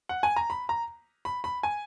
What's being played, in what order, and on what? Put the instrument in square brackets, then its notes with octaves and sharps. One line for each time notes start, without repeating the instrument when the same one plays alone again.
[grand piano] F#5
G#5
A#5
B5
A#5
B5
B5
G#5